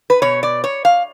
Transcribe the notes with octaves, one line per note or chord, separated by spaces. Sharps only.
B4
B2 C#5
D5
C#5
F5